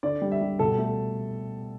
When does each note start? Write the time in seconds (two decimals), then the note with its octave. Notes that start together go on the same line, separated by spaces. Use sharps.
0.03 D3 D5
0.22 G3
0.32 E5
0.41 G3
0.59 B2 A4
0.78 A3